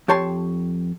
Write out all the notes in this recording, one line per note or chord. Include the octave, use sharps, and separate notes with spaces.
F2 G4 C#5 A5 C6